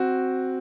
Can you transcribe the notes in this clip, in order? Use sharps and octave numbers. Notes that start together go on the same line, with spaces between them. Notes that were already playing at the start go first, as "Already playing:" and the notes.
Already playing: C4 F#4